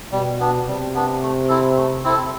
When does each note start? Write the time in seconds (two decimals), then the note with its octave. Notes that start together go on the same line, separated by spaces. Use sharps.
0.12 B2 G3
0.40 B3 D4
0.68 C3 G3
0.94 B3 D4
1.23 A3
1.49 C4 E4 A4
1.77 A3
2.04 C4 E4 A4